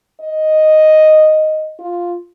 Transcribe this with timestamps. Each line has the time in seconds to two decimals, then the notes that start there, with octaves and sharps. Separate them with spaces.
0.21 D#5
1.79 F4